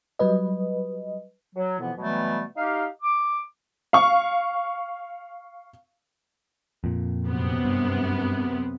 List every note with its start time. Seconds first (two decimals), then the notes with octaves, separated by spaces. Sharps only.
0.19 F#3 G3 B4 D#5
1.55 F#3
1.78 F2 B2 E3 F3 B3 E4
1.97 B2 E3 F#3 G3 A3 B3
2.56 D#4 G4 F5
3.02 D6
3.93 F5 C#6
6.84 F2 A#2
7.25 F#2 C3 B3
7.64 G2